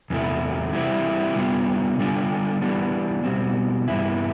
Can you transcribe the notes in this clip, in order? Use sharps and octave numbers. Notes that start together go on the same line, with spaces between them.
E2 C3 E3 A3 E4
E3 G3 C4 E4
C3 G3 B3 F4
D3 G3 D4 F4
E3 G3 B3 D4
B2 G3 C4
G2 E3 B3 E4